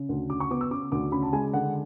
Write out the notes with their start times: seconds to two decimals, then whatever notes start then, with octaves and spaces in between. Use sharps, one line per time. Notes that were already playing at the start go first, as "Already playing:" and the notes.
Already playing: C#3
0.09 D2
0.30 C#3 D6
0.40 C#6
0.51 B3 D6
0.61 E6
0.71 C#3 D6
0.92 D2 D6
1.12 C#3 B5
1.23 A5
1.33 G#3 G#5
1.53 D3 F#5